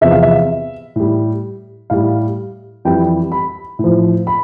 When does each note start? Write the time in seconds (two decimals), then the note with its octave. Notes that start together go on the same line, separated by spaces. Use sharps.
0.01 E2 C3 F3 E5
0.12 F5
0.22 E5
0.96 A2 G3
1.90 A2 G3 F5
2.85 F2 E3 G3 G5
3.32 B5
3.79 A2 F3
4.27 B5